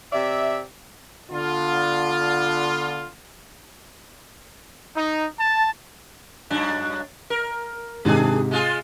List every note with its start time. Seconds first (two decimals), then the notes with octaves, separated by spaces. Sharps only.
0.13 C3 D5 E5
1.31 D3 B3 D4 F4
4.96 D#4
5.39 A5
6.50 G2 F#3 D4
7.30 A#4
8.05 G#2 C3 D#3 D4 G#4
8.51 G#3 F4 G#4